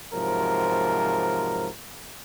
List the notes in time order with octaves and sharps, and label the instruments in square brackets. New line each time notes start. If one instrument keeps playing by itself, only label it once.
[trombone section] G#2 C3 F3 F#3 A#4